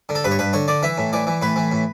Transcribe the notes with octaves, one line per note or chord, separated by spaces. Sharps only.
D3
A4
G2 B4
C#5
G2 B4
D3 C#5
D3 D5
E3 E5
A2
E3 D5
E3
A2 B4
E3
A2